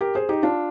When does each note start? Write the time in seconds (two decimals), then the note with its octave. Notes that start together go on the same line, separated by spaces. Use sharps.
0.01 G4 A#4
0.15 G#4 C5
0.29 D#4 G4
0.43 D4 F4